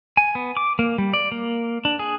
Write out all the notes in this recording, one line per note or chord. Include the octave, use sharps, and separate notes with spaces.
G#5
B3
D6
A#3
G3
D5
A#3
D4
G#4